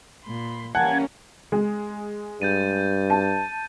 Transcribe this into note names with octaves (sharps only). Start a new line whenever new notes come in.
A#2 B5 C6
E3 G3 A#3 C#4 F#5 G#5 A5 G#6
G#3
G2 G6 A6 D#7
A5